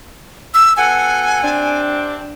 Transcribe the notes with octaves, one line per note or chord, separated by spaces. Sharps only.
E6
B2 A4 F#5 G#5
C3 C4 D4